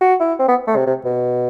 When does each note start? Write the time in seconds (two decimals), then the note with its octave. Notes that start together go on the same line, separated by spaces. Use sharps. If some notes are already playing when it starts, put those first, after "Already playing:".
0.01 F#4
0.20 E4
0.39 C4
0.48 B3
0.67 A3
0.77 C3
0.87 C3
1.05 B2